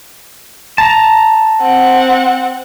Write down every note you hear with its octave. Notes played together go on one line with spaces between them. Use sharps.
A5 A#5
C4 F#5